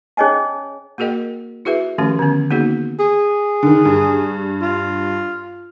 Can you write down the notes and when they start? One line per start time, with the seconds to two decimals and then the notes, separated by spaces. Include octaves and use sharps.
0.17 C#4 G#4 C#5 D#5 G#5 A5
0.98 A#3 F#4 G#4 A#4 D#5 G5
1.65 E4 F#4 G#4 B4 E5
1.98 D#3 F3 A3 C#4 G4 A4
2.19 D3 B3 C#4
2.51 A#3 B3 D#4 F#4 G#4
3.00 G#4
3.63 D3 D#3
3.85 G2
4.62 F4